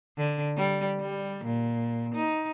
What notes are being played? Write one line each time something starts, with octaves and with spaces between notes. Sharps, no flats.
D3
G3
G3
A#2
D#4